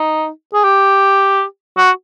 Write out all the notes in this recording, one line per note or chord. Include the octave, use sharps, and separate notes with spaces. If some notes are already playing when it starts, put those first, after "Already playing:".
Already playing: D#4
G#4
G4
F#4